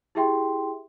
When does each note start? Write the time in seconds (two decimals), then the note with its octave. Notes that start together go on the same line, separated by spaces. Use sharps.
0.15 E4 G4 G#4 E5 G5 C6